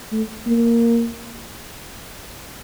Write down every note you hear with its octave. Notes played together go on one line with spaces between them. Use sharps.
A3
A#3